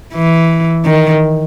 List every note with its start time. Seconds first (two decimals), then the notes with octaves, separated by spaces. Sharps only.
0.14 E3
0.86 D#3